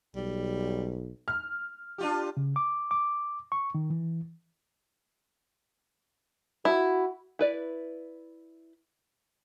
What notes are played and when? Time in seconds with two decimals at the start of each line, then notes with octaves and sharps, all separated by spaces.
0.15 B1 G3
1.28 F6
1.98 D4 F4 G4
2.37 C#3
2.56 D6
2.91 D6
3.52 C#6
3.75 D#3
3.90 E3
6.65 E4 F#4
7.39 E4 B4 D5